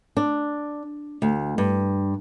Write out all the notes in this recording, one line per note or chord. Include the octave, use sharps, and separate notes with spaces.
D4
D2
G2